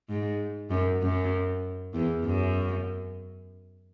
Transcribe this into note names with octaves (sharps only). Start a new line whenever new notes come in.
G#2
F#2
F#2
E2
F#2